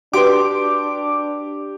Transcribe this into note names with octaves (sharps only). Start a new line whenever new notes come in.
D4 F#4 G4 B4 C6 D6